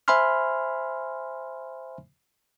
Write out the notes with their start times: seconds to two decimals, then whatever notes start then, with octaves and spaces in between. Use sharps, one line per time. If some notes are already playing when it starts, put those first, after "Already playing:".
0.08 C5 E5 G#5 B5 C6 F6